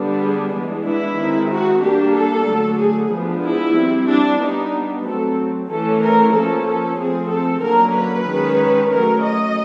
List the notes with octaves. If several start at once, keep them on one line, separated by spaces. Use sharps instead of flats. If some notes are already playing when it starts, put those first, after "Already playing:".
Already playing: D3 G3 B3 D4
G#4
E3 G#3 B3 D4
E4
D#3 G#3 C4
F#4
G3 A#3 D4 G4
A4
D3 F#3 A3 D4
G#4
F3 G#3 B3 D4
E4
G3 C4
D4
G3 B3 D4 D#4
F#3 A3 C4 A4
E3 A3 C#4 A4
A#4
F3 A#3 C#4 A4
A4
F3 A3 C4 G#4
A4
D3 F#3 A#3 C#4 A#4
B4
D#3 G#3 C#4
F#3 A3 C#4 A#4
D#5